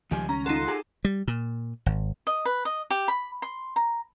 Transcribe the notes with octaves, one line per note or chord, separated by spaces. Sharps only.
C#2 D#3 F3 G3 G4 G#5
C#4 A#5
D#4 F4 A4 F#5 C6
G4 G#4
G3
A#2
G#1
D#5
B4
D#5
G4
B5
C6
A#5